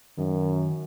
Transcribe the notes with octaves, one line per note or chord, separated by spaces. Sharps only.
F#2 D#3